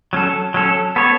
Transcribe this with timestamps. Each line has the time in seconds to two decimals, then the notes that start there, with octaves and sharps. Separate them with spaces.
0.13 F#3 C#4 A4
0.54 F#3 C#4 A4
0.96 B3 A4 C#5